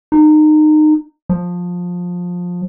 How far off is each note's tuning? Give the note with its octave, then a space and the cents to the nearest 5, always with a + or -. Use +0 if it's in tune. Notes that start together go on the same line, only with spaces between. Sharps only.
D#4 -25
F3 +20